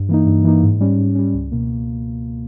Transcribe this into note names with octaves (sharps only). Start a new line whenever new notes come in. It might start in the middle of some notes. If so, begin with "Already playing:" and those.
Already playing: G2
E3 A#3 D#4
G2
E3 A#3 D#4
G#2
G3 C#4
G#2
G3 C#4
C#2
B2 A#3